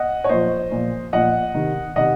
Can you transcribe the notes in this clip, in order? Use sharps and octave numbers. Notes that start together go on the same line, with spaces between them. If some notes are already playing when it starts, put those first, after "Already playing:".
Already playing: D#5 F#5
C#5
A#2 F3 C5 D#5
A#2 F3
A#2 F3 D#5 F#5
C3 D#3
C3 D#3 D#5 F#5